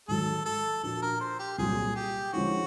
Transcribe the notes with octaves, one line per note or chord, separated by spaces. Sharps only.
G#2 D#3 F#3 A4
A4
A#2 F3 A#3 D4 F#4 A4
A#4
C5
G4
C2 A#2 F#3 G#4
G4
D3 F3 G#3 C#4 E4 F#4